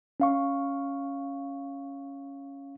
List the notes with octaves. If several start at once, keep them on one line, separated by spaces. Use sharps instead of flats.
C#4 F5 C#6